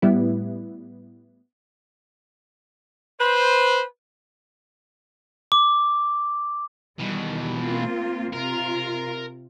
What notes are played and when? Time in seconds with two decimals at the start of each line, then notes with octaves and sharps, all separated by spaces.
0.02 A2 G3 B3 E4
3.20 B4 C5
5.52 D6
6.99 B2 D#3 E3 G3
7.57 A#3 C4 F4
8.33 C3 F4 A#4